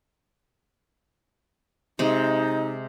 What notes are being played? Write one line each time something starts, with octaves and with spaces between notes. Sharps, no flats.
C3 G#3 D#4